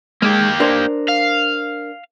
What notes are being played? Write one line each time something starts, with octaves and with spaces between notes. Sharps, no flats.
G#3 A#3 G4
D4 A#4 C5
F5